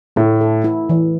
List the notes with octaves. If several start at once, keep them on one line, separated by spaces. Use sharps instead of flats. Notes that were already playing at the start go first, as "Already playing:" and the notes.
A2 A3
A4
E4
E3